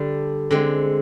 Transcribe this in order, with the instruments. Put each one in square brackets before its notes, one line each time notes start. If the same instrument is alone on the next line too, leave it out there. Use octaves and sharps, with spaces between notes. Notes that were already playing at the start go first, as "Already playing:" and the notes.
Already playing: [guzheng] D3 G3 D4
D3 G#3 C4